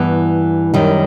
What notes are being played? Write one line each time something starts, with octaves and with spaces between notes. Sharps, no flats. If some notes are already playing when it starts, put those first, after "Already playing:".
Already playing: G2 E3 B3 E4
F#2 D#3 G3